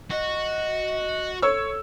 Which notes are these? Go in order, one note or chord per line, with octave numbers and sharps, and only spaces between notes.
F#4 D#5
A4 C#5 E6